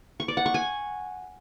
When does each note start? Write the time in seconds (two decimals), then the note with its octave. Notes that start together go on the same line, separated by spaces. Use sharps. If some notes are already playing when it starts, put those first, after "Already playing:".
0.20 C#6
0.28 D5
0.37 F#5
0.46 C#6
0.54 G#5